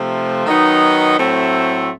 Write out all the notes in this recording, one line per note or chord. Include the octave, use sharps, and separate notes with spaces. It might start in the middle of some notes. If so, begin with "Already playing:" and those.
Already playing: C3 F3 A3
D#3 F#3 B3 D#4
A2 F#3 A3 C4